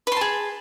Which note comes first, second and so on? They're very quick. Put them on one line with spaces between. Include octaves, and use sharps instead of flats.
B4 C6 A5 G#4